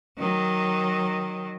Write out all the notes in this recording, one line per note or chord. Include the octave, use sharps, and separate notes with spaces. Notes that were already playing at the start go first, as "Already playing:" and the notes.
D#3 F#3